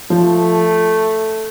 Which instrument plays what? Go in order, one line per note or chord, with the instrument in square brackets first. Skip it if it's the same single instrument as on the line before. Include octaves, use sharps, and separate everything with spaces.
[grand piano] F3 [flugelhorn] A3